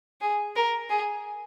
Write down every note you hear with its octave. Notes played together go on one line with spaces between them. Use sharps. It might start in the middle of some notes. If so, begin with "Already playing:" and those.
G#4
A#4
G#4